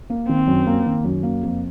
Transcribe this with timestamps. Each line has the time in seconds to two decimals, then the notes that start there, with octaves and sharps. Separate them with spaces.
0.10 A#3
0.28 D#3 C4
0.48 F#2
0.67 A#3
0.86 D#3
1.05 F#2
1.23 A#3
1.43 F2